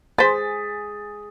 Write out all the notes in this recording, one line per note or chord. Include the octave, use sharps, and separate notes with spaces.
G#4 B4 C5 A6 B6